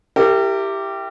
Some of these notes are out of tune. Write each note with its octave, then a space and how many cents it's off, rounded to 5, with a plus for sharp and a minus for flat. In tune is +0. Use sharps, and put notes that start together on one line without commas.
E4 +10 G4 +0 A#4 -35